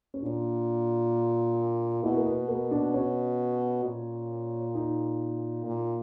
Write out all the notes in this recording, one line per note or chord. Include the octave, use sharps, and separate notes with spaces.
C#4
A#2 D4
B2 E4
A#3
B3
A#3
D4
C#4
A#2
D#4
A#2